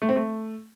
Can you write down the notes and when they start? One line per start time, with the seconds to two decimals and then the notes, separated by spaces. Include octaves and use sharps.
0.02 A3
0.09 C4
0.16 A3